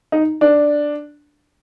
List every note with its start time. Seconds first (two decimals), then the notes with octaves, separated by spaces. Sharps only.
0.12 D#4
0.41 D4